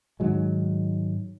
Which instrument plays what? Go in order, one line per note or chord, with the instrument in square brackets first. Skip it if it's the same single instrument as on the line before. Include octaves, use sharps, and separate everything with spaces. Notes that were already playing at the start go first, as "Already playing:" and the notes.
[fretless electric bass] G#2 D#3 F#3 G#3